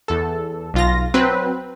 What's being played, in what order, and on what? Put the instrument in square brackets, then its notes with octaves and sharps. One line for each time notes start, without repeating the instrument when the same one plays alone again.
[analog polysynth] E2 A4
B1 F4 A#6
F#3 C4 B4